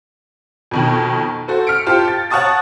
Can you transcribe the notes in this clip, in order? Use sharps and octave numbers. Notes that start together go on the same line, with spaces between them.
F2 B2 D#3
F#4 A4 C5
F6 B6 C#7 D7
F4 G4 C5 A5
A6
C#5 F#5 A5 C#6 D#6 A6